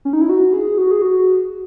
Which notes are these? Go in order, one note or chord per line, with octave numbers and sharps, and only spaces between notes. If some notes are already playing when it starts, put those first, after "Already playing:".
C#4
D#4
E4
F#4
G#4
F#4
G#4
F#4